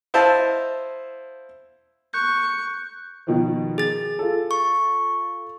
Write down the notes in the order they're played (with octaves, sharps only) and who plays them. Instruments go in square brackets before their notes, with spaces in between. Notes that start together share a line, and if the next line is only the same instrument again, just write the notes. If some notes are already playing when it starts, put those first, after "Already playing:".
[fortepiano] E4 C5 D#5 F5 A5 E6
[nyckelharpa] C#6 [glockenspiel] F#6 G6
[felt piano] B2 D#3 F3
[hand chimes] G#4 A6
[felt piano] F4 A4
[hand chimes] C#6